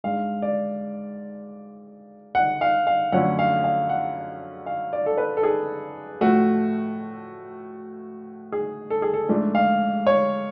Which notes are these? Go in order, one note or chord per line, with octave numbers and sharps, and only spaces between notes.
G#2 G#3 D4 F5
D5
F#5
F5
F5
F#2 D3 F3 A3 C#4 F#5
F5
F5
F#5
F5
D5
A4
B4
A4
G#4
A2 F3 A3 F#4
G#4
A4
G#4
A4
G#2 F3 A3 D4
F5
C#5